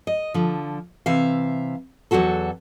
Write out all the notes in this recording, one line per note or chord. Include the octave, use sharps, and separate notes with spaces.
D#5
D3 F3
C3 E3 E5 F5
E2 B2 F#3 F#4 A4